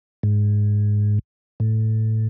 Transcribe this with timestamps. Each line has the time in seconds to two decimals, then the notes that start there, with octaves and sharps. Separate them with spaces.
0.23 G#2
1.60 A2